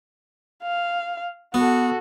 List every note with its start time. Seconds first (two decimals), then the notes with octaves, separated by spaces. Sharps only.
0.63 F5
1.54 B3 F#4 A4